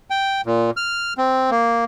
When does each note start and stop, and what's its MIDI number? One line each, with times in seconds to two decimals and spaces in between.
0.10 0.41 79
0.46 0.71 46
0.77 1.14 89
1.18 1.50 60
1.51 1.85 58